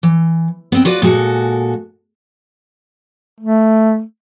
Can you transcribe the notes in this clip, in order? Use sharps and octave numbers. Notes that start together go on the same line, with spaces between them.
E3
B3 C4 G5
F4 F#4 B4 D5
A#2 G#3 F#4 A4
A3